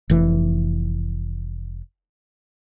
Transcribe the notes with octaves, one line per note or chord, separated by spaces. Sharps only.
F1 E3